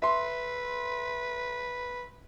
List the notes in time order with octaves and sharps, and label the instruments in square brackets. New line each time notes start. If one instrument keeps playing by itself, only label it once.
[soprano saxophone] B4 [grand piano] E5 C6